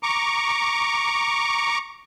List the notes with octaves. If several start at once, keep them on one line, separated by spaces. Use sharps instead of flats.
A#5 C#6 D6